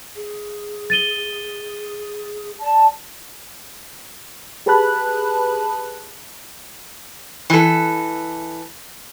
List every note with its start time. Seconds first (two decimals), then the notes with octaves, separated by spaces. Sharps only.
0.15 G#4
0.90 A6 D#7 G7
2.61 D5 A5
4.66 G4 G#4 B4 A5 B5 F#6
7.50 E3 A4